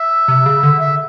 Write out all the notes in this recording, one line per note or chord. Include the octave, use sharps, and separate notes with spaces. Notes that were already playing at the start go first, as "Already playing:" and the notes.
Already playing: E5
C3
C#3
D3
E5